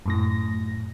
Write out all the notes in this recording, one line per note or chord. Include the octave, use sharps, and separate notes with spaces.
F#2 A2 A#6